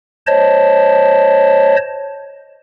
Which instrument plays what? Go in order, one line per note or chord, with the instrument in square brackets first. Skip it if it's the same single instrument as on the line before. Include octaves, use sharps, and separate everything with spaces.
[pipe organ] C5 C#5 D#5 A5